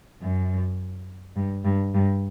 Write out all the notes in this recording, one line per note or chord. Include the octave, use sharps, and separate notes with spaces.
F#2
G2
G2
G2